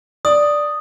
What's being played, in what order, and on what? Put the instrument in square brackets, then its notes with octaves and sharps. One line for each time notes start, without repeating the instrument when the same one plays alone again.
[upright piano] D5 [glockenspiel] D#6